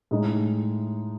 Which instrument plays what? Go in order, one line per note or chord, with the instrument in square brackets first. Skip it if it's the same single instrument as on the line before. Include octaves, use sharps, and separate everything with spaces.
[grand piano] A2 G#3 D#4